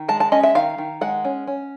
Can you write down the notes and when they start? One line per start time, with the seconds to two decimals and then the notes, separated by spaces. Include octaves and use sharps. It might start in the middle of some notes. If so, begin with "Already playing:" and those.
Already playing: D#3
0.08 G#3 A5
0.20 A5
0.32 C#4 D#5
0.43 E5
0.55 D#3 F5
0.78 D#3
1.01 G#3 F#5
1.25 C#4
1.47 C#4